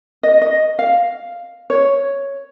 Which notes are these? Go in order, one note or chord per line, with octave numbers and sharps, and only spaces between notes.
D#5
D#5
F5
C#5